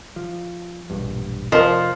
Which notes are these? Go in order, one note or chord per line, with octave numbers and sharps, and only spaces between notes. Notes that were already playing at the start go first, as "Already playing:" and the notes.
F3
E1 A#1 G2
F1 F3 A#4 D#5